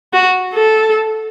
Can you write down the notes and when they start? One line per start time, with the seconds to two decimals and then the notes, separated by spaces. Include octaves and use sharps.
0.13 F#4
0.55 A4